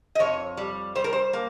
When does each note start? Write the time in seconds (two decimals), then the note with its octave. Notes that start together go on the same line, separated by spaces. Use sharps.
0.15 D#5
0.19 F2 C#5
0.57 G3
0.95 G3 C5
1.04 A#4
1.13 C5
1.33 A#3